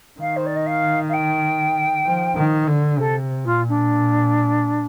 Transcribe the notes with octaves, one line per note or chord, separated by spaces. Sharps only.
D#3 F5
C5
D5
D#5
F5
F5
G5
F3
D#3
D3
C3 A4
A#2 F4
D4